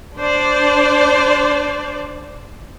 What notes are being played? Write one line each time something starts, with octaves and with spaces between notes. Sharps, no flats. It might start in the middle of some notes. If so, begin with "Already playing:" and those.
D4 C5 D5